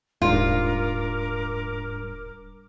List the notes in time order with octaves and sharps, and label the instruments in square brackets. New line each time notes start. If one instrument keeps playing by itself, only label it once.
[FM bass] D#1 [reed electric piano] G#2 G3 D4 [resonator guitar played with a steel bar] F4 [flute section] A#4 D6